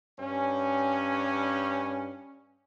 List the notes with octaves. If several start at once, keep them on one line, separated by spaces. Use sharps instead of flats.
G2 C#4